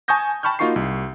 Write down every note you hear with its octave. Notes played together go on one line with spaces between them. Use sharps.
G#5 A5 C#6 D#6 G6 A#6
G5 A5 B5 C#6 F6 G6
A#3 D#4 F4 F#4 C#6 C7
C2